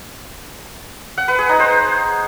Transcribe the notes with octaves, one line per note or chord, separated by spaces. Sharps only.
F#5
B4
G#4
D#4
C5